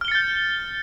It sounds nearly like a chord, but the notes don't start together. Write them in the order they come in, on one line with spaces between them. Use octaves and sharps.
F6 G7 C#7 A6 G6